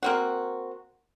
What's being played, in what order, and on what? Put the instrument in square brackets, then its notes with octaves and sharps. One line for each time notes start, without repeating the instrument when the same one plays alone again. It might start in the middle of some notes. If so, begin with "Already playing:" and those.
[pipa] A#3 C4 F#4